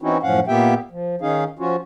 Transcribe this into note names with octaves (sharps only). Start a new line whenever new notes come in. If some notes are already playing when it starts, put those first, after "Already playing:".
E3 C4 C#4 D#4 E4 F#4
F#2 A2 F3 C#4 F5 F#5
A#2 A#3 B3 G4 E5 G5
F3
D#3 C#4 D#4 G#4 F5
F3 C#4 F4 F#4